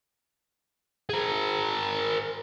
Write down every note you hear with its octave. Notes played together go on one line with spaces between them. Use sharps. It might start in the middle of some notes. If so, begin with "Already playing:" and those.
G#4 A#4